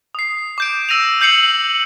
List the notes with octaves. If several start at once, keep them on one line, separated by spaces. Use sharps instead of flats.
D#6 C7
D6 G6 D7
E6 A#6 D#7 F7
E6 G6 C7 C#7 F#7